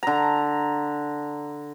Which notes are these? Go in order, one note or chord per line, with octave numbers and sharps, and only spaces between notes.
D3 A#5